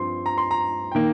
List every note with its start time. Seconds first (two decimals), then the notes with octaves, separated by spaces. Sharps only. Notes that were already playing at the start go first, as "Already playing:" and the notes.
Already playing: G2 F3 C4 C6
0.26 A#5
0.38 C6
0.51 A#5
0.92 D#3 A#3 G5